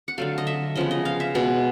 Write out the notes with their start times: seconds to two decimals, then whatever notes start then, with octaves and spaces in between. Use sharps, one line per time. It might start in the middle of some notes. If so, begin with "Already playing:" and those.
0.08 F#5
0.18 D3 F#3 A3 F5
0.38 D#5
0.47 E5
0.75 C#3 F3 G#3 B3 D#5
0.91 D#5
1.05 F5
1.20 E5
1.35 B2 G#3 B3